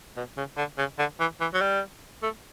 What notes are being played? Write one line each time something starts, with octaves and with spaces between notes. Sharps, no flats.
B2
C#3
D3
C#3
D3
E3
E3
F#3
G3
A3